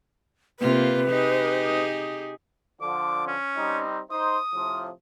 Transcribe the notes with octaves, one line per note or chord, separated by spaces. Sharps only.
C3 A#3 F4 B4
D#4 G4 G#4
D3 F3 D6
C#4
G3 C4 D#4
D#4 C5 D#6
A2 C3 F3